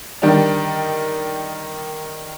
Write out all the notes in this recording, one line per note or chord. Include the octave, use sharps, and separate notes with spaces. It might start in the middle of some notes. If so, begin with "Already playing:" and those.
D#3 G3 D4